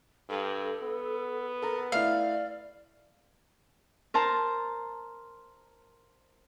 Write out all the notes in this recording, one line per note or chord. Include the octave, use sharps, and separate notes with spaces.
G2 A4
B3
A4 A#4
A3 E4 D5 F5
A#4 C5 A5 A#5